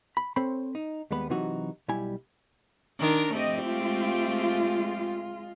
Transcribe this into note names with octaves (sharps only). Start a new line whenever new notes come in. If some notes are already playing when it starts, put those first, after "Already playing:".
B5
C4 A4 C5 C#5 B5
D#4
D#2 G3 G#3 B3 B4
C3 E3 F#3 D#4 F#4
B1 G3 E4 G#5
D#3 D4 A#4
F3 A3 C4 G4 D#5
G#3 F4